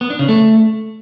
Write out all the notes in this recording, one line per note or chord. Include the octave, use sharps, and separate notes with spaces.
B3
D4
C#3
A3